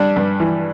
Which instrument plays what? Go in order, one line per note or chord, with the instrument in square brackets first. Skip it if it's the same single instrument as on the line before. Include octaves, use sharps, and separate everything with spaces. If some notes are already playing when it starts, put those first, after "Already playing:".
Already playing: [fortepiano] G3 D4
G2
E3